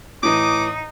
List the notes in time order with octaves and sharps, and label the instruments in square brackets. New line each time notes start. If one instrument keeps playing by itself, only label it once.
[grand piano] A2 E3 [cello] D#4 [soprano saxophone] D6 [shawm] D#6